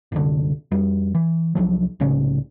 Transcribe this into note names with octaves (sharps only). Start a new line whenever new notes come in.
F#1 C2 D3
F2 G3
E3
C2 F3 F#3
C2 A2 C#3 C#4